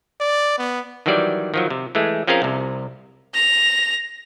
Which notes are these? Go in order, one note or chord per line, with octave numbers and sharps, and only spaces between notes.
D5
B3
D#3 E3 F#3 G3 D5
D#3 F3 F#3
C3
E3 G#3 A3
F3 C4 C#4 G#4 A#4 F5
C2 C3
A#6 F7